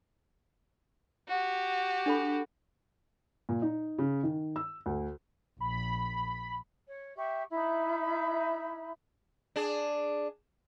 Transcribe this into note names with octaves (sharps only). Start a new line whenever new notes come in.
F#4 G4
D4 A4 B5
A#2
D#4
C#3
D#3
E6
D2
A#1 B5
C#5
G4 E5 C#6
D#4 E4 E5 B5
D4 G#4